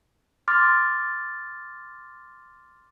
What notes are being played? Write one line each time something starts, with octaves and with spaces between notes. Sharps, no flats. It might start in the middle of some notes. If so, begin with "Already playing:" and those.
C6 D6 F6 A6